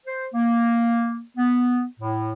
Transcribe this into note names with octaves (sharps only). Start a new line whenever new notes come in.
C5
A#3
B3
A2